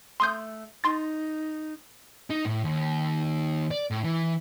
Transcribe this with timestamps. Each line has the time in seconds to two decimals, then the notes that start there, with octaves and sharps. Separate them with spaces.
0.20 A3 C6 D#6 G6
0.84 D#4 C6 A6
2.30 D#4
2.45 A2
2.64 D#2
3.71 D5
3.91 A2
4.04 E3